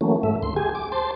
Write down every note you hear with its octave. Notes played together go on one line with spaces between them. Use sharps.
E3 F#3 A3 A#3 C#4
G#2 A3 E5
D2 C6
G4 G#4 G#5
D6
C5 A5 C6